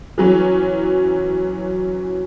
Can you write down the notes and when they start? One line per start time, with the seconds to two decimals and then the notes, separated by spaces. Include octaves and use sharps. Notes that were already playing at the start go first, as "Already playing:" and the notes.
0.18 E3 F#3 C#4